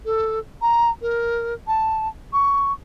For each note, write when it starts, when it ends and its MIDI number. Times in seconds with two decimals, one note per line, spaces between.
0.05 0.39 69
0.62 0.90 82
1.02 1.54 70
1.67 2.08 81
2.33 2.72 85